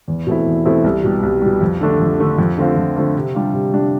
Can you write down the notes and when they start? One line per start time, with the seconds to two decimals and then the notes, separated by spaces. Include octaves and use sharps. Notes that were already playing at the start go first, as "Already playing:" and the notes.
0.08 E2
0.27 B2 A3 C4 E4
0.47 E2
0.65 B2 A3 C4 E4
0.84 C2
1.04 B2 G3
1.23 C2
1.42 B2 G3
1.61 F2
1.81 D3 A3 D4
2.00 F2
2.19 D3 A3 D4
2.38 F2
2.58 D3 A3 C4 F4
2.77 F2
2.96 D3 A3 C4 F4
3.16 C3
3.35 G3 D4 F4
3.53 C3
3.73 G3 D4 F4